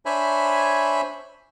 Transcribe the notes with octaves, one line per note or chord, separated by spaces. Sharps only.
D4 C5 C#5 E5 G#5 B5